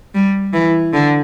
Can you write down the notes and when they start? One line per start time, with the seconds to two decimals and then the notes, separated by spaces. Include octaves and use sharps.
0.15 G3
0.53 E3
0.93 D3